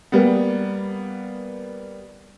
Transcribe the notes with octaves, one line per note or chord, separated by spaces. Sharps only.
G3 A#3 B3